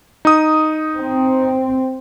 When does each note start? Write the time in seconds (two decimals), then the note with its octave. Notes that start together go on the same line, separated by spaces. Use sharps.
0.25 D#4 D#6
0.98 C4